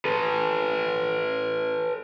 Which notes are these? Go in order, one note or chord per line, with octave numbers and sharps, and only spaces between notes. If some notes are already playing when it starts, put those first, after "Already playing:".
A4 B4